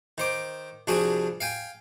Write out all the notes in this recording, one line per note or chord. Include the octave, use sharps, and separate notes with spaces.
D#3 C5 D6
C2 F3 D4 F#4 G#4 G#5
F5 G5 G#5